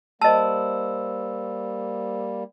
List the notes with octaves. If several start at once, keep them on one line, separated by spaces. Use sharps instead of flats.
G3 A#3 C5 D#5 A5 E6